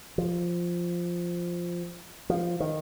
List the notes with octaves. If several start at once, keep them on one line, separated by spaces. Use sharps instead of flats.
F3
F3
D#3